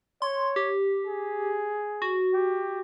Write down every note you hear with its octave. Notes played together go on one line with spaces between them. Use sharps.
C#5 C6
G4
G#4
F#4
G4